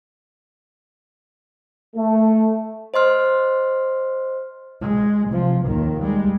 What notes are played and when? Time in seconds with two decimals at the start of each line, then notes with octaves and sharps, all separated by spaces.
1.96 A3
2.94 C5 D#5 C6 F6
4.81 G#3
5.28 C3 F3
5.65 D#2 D#3
6.03 G3 G#3